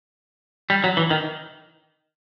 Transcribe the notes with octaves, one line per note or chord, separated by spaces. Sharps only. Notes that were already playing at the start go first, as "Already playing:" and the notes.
G3
F#3
E3
D#3